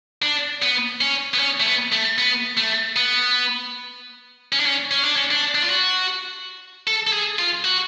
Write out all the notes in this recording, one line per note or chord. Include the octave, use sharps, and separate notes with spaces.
D4
B3
C#4
B3
C#4
A3
B3
A3
B3
A3
B3
C#4
D4
C#4
C#4
D4
C#4
D4
D4
F4
F#4
A4
A4
G#4
F4
F#4